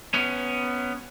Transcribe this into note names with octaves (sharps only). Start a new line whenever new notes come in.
B3 C#4